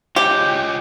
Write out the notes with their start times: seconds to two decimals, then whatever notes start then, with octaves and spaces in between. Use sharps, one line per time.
0.16 F4 G4 C#5 D#5